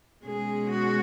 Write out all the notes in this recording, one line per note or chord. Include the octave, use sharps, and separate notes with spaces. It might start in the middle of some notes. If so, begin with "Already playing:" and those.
B2 G#3 C#4 G#4
F#4